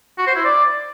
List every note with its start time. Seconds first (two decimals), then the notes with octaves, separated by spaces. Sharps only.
0.19 F#4
0.27 C5
0.36 E4
0.45 D5